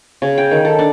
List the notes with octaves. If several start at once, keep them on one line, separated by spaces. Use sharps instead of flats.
C#3
G5
D#3
A4
D4